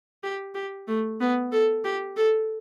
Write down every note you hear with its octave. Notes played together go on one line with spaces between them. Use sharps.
G4
G4
A3
B3
A4
G4
A4